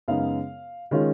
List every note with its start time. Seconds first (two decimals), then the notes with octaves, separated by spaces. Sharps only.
0.08 F#2 C#3 G#3 B3 D#4 F5
0.91 D#3 G#3 C#4 F4